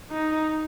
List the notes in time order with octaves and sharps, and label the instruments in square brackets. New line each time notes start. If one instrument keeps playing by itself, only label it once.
[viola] D#4